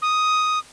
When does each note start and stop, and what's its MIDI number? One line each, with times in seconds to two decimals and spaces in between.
0.02 0.59 87